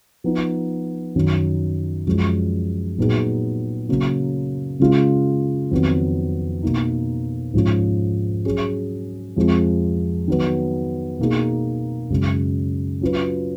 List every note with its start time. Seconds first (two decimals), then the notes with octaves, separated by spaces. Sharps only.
0.24 F3 B3 D#4
1.16 F#2 D#3 F#3
2.07 F#2 F3 G#3
2.98 A#2 F#3 B3 D#4 G#4
3.89 C#3 F#3 A#3
4.80 C#3 G#3 C#4 F4
5.71 F2 D#3 F#3 B3
6.63 B2 A#3 D#4
7.53 G#2 F3 G#3 C#4 F4
8.45 F#3 C#4 G#4
9.36 F2 F3 G#3
10.28 D#3 F#3 B3
11.19 B2 A#3 D#4 G#4
12.10 F#2 C#3 G#3
13.01 F#3 C#4 F4 B4